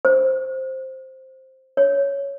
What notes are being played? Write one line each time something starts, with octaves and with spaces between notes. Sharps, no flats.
C5
C#5